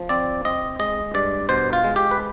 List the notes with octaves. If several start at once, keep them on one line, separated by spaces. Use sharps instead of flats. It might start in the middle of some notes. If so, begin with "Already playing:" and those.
Already playing: F3
C4 D5
C4 D#5
G#3 D#5
G2 D5
B2 C5
F4
G#3
G4
B4